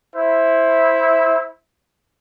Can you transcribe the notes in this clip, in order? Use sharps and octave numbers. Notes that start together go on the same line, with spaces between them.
E4 C5 E5